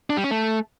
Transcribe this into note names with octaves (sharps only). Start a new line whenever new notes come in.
D4
G3
C#4
A3